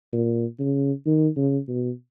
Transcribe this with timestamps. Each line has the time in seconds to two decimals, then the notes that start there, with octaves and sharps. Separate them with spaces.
0.12 A#2
0.59 C#3
1.06 D#3
1.36 C#3
1.68 B2